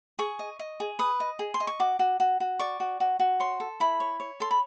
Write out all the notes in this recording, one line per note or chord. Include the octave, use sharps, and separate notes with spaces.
G#4 C#6
D#5
D#5
G#4
B4 D#6
D#5
G#4
C6
D#5
C#6
F#4 D6
F#4
F#4
F#4
D5 C#6
F#4
F#4
F#4
C#5 C6
A4
E4 B5
C#5
C#5
A4 C6
B5